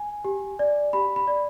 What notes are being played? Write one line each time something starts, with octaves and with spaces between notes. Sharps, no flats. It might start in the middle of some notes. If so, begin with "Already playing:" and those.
Already playing: G#5
G4
D5
G4 B5
B5
D5